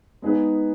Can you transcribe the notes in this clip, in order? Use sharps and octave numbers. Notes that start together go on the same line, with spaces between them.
G#3 B3 D#4 G#4 B4